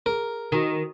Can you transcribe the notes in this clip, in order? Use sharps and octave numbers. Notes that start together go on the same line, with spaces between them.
G#4 A#4 A#5
D#3 F#4 A#5 D#6